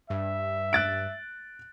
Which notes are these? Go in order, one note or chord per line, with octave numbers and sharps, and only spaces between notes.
G2 E5
F#6 A6 D7